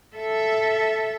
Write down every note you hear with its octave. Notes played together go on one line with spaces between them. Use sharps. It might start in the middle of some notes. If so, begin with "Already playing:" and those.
A4 E5